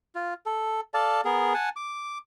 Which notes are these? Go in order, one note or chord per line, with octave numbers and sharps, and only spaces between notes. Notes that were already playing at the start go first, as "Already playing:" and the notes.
F4
A4
A4 D5 F5 A5
B3 G#4 A#4
F#5 G#5 A5
D6